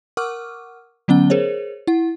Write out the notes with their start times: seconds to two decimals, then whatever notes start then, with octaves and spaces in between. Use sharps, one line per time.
0.17 A#4 F#5 C#6 D6 E6 F6
1.08 D3 F#3 B3 C#4 F#5 G7
1.30 G#4 A#4 C5 C#5
1.87 E4 F#5